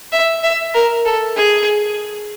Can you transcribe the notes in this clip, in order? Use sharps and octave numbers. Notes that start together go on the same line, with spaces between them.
E5
E5
A#4
A4
G#4